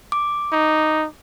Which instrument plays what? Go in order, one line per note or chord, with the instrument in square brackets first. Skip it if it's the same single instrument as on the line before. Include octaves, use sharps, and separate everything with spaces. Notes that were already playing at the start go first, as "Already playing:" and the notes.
[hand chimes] D6
[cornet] D#4